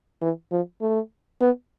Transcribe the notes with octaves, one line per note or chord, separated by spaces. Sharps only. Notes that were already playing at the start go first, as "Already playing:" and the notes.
E3
F3
A3
B3